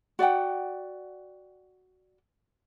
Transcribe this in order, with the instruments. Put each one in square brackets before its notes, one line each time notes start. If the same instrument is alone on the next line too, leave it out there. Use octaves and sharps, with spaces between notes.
[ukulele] F#4 D5 F#5 G5